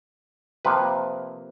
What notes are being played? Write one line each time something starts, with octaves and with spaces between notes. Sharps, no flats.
C3 F3 A#3 B4